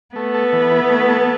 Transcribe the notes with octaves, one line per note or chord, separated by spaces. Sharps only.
A3 B3
A4
E3
E4
A3
A4